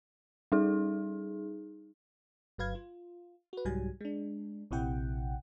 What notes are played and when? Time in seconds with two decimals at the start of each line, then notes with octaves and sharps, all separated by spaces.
0.52 G3 D#4 G#4
2.58 G1 F#3 B4 F5 G#6
2.75 F4
3.53 F#4 B4
3.65 C2 G#2 F#3 G3 G#5
4.01 G#3 D4
4.71 A#1 C3 E4 F#5 G5